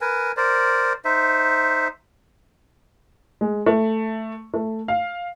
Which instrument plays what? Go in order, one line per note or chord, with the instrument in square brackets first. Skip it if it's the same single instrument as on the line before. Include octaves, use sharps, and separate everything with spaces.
[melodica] A#4 B4 G#5
A#4 C5 D5
D#4 C5 E5
[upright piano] G#3
A3
A3
F5